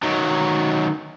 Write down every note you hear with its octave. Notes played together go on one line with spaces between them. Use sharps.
D#3 F#3